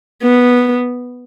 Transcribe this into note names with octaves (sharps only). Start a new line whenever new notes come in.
B3